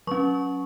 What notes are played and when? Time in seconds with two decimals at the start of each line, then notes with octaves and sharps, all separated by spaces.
0.07 F#3 C#4 C#6